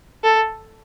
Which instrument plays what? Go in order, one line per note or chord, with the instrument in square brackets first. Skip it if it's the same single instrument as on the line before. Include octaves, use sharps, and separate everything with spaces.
[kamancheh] A4